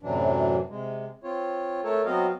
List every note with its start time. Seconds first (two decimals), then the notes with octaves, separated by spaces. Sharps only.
0.03 F#2 A2 C3 E3 F#3 D4
0.69 C3 G#3
1.24 C4 F4 C#5
1.84 A3 A4 A#4 C#5
2.06 F#3 B3 C4 F#4 D#5 F5